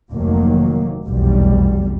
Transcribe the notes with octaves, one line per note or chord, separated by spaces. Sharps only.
F1 D2 D#3 F#3 A#3
F1 B1 E2 G3